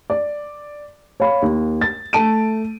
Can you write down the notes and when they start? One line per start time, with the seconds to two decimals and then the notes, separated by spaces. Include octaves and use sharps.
0.10 D5
1.20 C#5 F5 B5
1.42 D#2
1.81 A6
2.13 A3 A5 D7 D#7